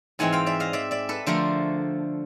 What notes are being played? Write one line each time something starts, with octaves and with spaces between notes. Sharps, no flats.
G#2 E3 G#3 C4 F#5 G#5
F5 G5
D5 E5
D#5 F5
D5 E5
D5 E5
A4 B4
D3 F3 A3 A#4 C5